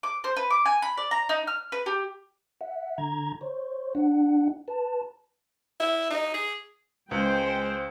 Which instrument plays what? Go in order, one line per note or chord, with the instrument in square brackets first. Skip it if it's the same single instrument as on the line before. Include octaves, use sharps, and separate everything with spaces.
[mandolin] D6
C5
B4
D6
G#5
B5
D5
A#5
D#4
F6
B4
G4
[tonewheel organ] E5 F#5
D3 A#5 G#6
C5 C#5
D4 F#5
B4 A5
[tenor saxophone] E4
D#4
G#4
[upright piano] C#2 [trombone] G#3 [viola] C5 [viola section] G5